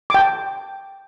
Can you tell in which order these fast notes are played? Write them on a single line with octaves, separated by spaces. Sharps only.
D6 G5 A5